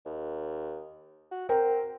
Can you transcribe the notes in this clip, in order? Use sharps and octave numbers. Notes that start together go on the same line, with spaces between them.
D#2
F#4
C4 A#4 G5